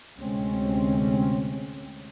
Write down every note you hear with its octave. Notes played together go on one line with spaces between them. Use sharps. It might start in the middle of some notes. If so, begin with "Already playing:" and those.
D2 C3 G#3 C4 C#4